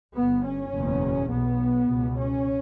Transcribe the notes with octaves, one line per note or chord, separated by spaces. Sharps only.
G1 G2 B3
C#4
F#1 E2 B2
B1 B2 B3
C#2 B2
C#4